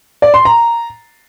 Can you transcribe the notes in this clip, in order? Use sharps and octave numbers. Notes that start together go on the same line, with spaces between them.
D5
C6
A#5